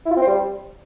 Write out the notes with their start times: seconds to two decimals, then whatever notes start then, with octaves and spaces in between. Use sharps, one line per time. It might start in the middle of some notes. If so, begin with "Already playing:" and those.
0.06 E4
0.11 F4
0.16 C4
0.22 C5
0.27 G3